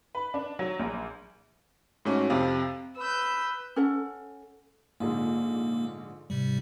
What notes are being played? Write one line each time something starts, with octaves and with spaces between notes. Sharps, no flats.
B4
D4
F#3
A#1
G#2 A3 C#4 F#4
F2 C3 C4 F5
B4 E6 G6
C#4 A4 F#5
A#1 G#2 D3 A#3
G#2 C3 G3